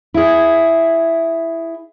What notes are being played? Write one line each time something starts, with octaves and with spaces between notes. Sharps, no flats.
E4 G#4